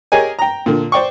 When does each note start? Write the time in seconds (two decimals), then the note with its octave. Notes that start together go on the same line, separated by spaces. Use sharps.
0.12 G4 G#4 A#4 C#5 D#5 G#5
0.39 G5 A#5
0.66 A#2 D3
0.92 C5 D5 G5 C#6